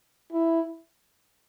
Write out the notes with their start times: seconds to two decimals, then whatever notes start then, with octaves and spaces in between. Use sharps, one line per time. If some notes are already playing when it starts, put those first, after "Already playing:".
0.32 E4